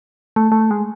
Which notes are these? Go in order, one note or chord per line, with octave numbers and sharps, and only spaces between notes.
A3
A3
G#3